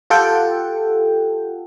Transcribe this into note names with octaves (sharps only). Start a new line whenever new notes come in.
F4 G4 A4 F#5 G5